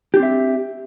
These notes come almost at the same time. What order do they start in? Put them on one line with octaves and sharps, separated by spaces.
G4 D4 C4 E5